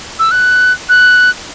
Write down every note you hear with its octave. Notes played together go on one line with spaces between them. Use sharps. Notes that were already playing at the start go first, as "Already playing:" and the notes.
E6
F#6
F#6